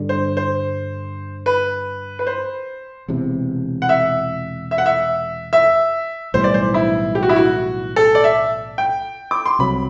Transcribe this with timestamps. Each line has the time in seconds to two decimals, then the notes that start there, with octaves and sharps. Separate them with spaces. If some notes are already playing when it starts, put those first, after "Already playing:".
Already playing: G2 D3 G3
0.09 C5
0.37 C5
1.46 B4
2.19 B4
2.27 C5
3.08 E1 E2 C3
3.82 F#5
3.89 E5
4.71 E5
4.78 F#5
4.86 E5
5.53 E5
6.34 B1 A2 E3 G3 C5
6.44 D5
6.54 C5
6.74 E4
7.15 G4
7.23 F#4
7.29 E4
7.36 F#4
7.96 A4
8.15 D5
8.24 E5
8.78 G5
9.31 D6
9.46 C6
9.59 C2 C3 F#3 C4 B5